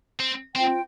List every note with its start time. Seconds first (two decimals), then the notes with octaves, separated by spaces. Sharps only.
0.20 C4
0.55 C4 F4 C5 G5